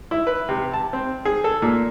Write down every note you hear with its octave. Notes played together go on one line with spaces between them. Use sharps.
E4
B4
C3
A5
C4
G#4
A4
A#2